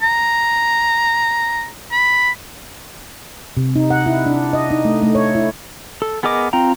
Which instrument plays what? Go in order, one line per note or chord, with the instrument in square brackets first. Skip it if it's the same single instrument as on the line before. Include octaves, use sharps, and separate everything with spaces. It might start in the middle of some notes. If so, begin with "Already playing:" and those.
[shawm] A#5
B5
[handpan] C3
D#4
F#5
E4
D4
D#5
D#4
A3
A3
C#5
E4
[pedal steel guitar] A4
B3 G#4 A#4 D#5 D6
C4 F4 G5 A#5